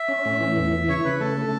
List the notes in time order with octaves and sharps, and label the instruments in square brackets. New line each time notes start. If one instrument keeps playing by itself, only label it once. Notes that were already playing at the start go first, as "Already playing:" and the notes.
Already playing: [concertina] E5
[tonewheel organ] C#4
A2
E3
E2
E3
[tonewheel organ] C#3 [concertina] C#5
[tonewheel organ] C#3 [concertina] B4
[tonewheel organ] A3 [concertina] A4
[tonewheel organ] A3